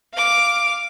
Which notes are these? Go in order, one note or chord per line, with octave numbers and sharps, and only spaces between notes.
F5 D6